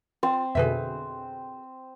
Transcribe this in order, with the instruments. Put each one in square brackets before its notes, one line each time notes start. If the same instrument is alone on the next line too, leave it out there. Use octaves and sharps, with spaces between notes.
[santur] C4 [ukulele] F4
[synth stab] F2 B2 D3 [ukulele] G#4 B4 E5